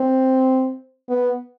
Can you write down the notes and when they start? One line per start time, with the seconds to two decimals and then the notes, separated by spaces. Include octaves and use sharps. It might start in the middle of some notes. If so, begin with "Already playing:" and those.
Already playing: C4
1.09 B3